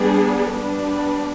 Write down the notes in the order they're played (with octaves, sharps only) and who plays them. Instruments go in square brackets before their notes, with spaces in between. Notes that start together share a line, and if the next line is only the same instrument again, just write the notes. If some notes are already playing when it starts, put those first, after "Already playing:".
Already playing: [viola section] G3 B3 D4 G#4
G3 B3 D4 B4